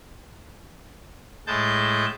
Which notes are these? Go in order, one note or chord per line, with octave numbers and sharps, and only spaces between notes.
A2 G#3 A5 G6